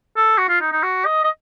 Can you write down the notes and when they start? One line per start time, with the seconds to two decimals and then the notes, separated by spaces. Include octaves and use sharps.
0.16 A4
0.38 F#4
0.49 F4
0.61 D#4
0.72 D#4
0.83 F#4
1.05 D#5
1.24 D#5